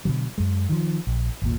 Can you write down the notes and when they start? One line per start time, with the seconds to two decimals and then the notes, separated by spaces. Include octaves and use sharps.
0.05 B2 D3 F#3
0.38 F#2 G#3
0.69 D#3 F3
1.07 A#1
1.42 G#1 D#2 A#2